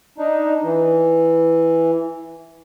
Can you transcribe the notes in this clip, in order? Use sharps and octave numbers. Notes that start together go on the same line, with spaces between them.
D4 D#4
E3